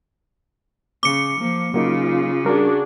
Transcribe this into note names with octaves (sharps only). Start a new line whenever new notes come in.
C#3 D6 C#7
F3 A#3
C#3 F#3 A#3 D#4 F4
G3 D4 F#4 G#4 A#4